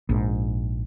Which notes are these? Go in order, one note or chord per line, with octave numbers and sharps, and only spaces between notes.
A#1 G#2